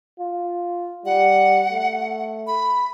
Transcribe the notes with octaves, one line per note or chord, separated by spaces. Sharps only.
F4
G3 F#5
A3
B5